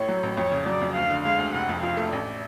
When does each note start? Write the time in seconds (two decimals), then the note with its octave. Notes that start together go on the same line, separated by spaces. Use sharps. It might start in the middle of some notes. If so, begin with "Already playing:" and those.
Already playing: A1 A2 C#5
0.09 F#3
0.23 A1
0.37 F2 C#5
0.52 C#3
0.66 F#3 D5
0.82 F2
0.95 D2 F5
1.10 D3
1.25 G#3 F5
1.39 D2
1.53 F1 F#5
1.69 F2
1.82 F3 F5
1.97 A3
2.12 A1 D5